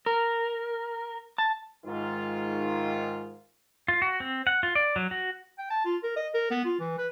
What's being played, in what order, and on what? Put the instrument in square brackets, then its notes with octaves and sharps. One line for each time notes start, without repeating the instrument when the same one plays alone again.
[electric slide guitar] A#4
A5
[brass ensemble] G#2 D#3 F4
[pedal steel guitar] F4
F#4
C4
F#5
F4
D5
F#3
F#4
[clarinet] G5
A5
F4
A#4
D#5
A#4
B3
F4
E3
B4